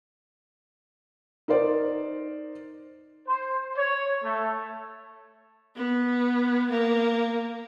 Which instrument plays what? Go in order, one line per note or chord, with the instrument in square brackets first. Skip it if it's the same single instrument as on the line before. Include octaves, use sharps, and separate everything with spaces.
[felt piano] D#4 A#4 C5 D5
[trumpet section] C5
C#5
A3
[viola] B3
A#3